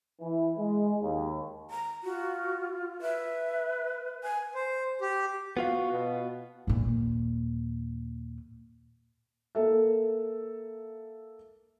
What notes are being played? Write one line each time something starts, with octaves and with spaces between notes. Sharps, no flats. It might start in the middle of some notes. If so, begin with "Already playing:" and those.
E3
G#3
D#2
A#5
F4 F#4
B4 E5
G#5
C5
G4
B3 F4 F#4 F5
B2
D#2 A#2
A#3 A4 E5